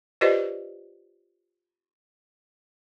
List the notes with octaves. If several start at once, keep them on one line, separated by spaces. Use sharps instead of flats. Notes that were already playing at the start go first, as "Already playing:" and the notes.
F4 G4 B4 C5 D5 D#5